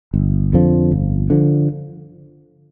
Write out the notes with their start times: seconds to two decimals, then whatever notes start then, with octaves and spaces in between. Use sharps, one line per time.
0.14 G1
0.53 F2 D3 F3
0.91 G1
1.30 D3 F3